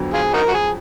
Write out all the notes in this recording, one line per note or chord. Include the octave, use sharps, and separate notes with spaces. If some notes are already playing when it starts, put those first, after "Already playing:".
Already playing: F2 D3 F#3 B3
F4 G#4
D#4 F#4 A#4
F#4
G#4